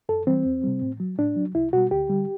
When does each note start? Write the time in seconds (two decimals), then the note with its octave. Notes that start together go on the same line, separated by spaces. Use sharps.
0.09 F#2 A4
0.27 E3 G3 C4
0.45 E2
0.64 C3 G3
0.82 A2
1.00 F#3
1.18 A2 D4
1.36 F#3
1.55 C2 E4
1.73 B2 G3 F#4
1.91 D2 G4
2.09 D3 G3